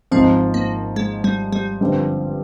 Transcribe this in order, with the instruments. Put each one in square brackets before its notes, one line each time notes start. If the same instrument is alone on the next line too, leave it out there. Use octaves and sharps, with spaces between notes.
[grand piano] G#1 G#2 F3 [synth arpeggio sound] C4
[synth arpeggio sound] A#3
G#3
G3
G3
[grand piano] G2 D3 F3 C4